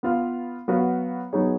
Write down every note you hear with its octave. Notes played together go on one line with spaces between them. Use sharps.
B3 F4 B4 F5
F#3 B3 F#4 B4 F5
F#3 B3 D#4 G#4 C#5